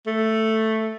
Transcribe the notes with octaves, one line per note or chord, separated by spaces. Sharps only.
A3